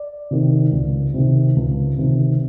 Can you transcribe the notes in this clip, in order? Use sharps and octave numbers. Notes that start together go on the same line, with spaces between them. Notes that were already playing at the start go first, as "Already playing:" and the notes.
Already playing: D5
C3 D#3
C#2
C3 D#3
C#2
C3 D#3